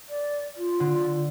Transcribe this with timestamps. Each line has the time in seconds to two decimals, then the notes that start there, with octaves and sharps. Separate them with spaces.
0.09 D5
0.57 F4
0.80 D3